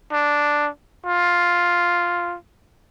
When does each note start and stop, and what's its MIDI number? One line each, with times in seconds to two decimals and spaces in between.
0.12 0.69 62
1.06 2.36 65